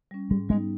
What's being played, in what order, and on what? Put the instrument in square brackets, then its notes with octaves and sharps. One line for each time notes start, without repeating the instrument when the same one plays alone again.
[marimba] G3 C#4
[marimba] G#2 [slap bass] G3
[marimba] G3 B3 D#4 [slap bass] G#3